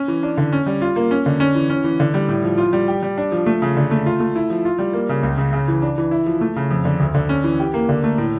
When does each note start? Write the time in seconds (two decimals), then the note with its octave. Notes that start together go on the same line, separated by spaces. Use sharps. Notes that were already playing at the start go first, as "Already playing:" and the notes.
Already playing: C#4
0.08 E3
0.23 D4
0.37 D3
0.52 C#4
0.66 G3
0.82 F4
0.96 A#3
1.11 C#4
1.26 D3
1.40 C#4
1.55 E3
1.70 C#4
1.84 E3
2.00 D3
2.14 G3
2.28 A2
2.44 F3
2.58 F4
2.73 G3
2.88 G4
3.03 G3
3.18 D4
3.32 F3
3.46 A3
3.62 C#3
3.77 D3
3.91 A3
4.06 F4
4.20 A3
4.36 E4
4.50 F3
4.65 F4
4.79 G3
4.93 A#3
5.09 C#3
5.23 C#2
5.38 C#3
5.53 C#3
5.68 E3
5.82 D4
5.98 E3
6.11 E4
6.26 F3
6.41 A3
6.56 C#3
6.71 F2
6.85 D3
7.00 D2
7.14 D3
7.29 C#4
7.44 E3
7.60 G4
7.74 A#3
7.89 D3
8.04 A3
8.18 A2